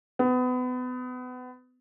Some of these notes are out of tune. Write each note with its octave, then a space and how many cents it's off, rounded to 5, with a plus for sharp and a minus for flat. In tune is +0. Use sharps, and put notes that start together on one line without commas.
B3 +30